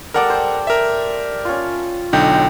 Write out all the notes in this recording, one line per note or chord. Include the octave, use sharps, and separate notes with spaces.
G3 A4 A#4 D5 F#5
C5
A#4 E5
C#4 F4
B1 D3 D#4 G5